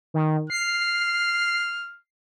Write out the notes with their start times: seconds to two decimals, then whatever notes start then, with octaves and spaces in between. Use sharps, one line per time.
0.14 D#3
0.50 F6 C7